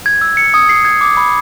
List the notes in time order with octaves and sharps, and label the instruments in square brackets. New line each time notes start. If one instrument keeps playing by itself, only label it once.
[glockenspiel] G#6
E6
C#7
D#6
C7
G#6
D6
B5